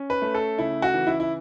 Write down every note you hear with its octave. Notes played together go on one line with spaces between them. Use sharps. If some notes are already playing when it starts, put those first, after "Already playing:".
Already playing: C#4
B4
A3
A4
C#3 E4
F#4
E3
E4
E4